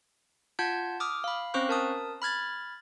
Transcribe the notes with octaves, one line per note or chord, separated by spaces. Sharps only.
F4 F#5 A5 G6 G#6
D6 D#6 F6
F5 B5
C4 C#4 C5 F5 C#6 F#6
A#4 A5 D#6
B5 F6 G#6 A6